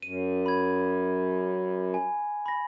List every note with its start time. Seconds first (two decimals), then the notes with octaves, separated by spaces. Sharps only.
0.02 F#2 D#7
0.46 B5 G#6
1.94 G#5
2.46 B5 A#6